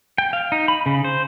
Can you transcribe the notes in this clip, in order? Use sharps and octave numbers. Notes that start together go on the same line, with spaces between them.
G5
F5
D#4
B5
C#3
C5